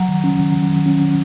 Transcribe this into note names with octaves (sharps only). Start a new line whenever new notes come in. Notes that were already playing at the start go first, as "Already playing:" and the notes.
Already playing: F#3 F#5 A#5
D#3
C#4
D#3
F#3
D#3
C#4
D#3